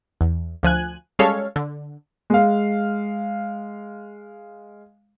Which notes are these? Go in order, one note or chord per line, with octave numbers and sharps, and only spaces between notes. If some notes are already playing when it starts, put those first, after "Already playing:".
E2
D2 F3 G#5 F#6
G3 G#3 C#4 A4 C#5 F5
D3
G#3 F5